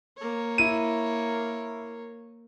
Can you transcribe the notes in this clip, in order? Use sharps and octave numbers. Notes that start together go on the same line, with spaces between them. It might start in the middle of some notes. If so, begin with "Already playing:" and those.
A#3 C#5
E4 D#7